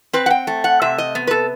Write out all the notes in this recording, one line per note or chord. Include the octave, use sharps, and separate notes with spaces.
C4 B4
F#5
G5
A3
F#5
C3 E5
D#5
B3
B4
A4